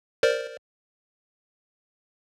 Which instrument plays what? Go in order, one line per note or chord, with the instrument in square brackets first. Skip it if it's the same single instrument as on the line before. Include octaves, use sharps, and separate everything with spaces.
[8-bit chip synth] A#4 C5 D5